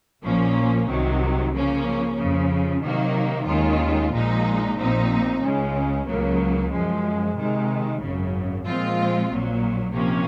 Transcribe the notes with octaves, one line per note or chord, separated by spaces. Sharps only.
A#1 A#2 F3 A#3 C#4
C2 C3 D#3 F#3
C#3 F3 A#3 C#4
F2 C#3 F3
C3 D#3 F#3 A#3
D#2 D#3 G#3 C#4 F4
A#1 A#2 F3 G#3 D#4
A#1 A#2 F3 C4 D#4
C#2 C#3 G#3 C#4
C#2 C#3 F#3 A#3
F#2 F3 G#3
C3 D#3 G#3
G#1 F#2 C#3
A#2 F3 G#3 C4 F4
A#1 A#2 F#3
C3 F3 A#3 C#4